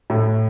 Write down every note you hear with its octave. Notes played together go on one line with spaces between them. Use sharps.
A2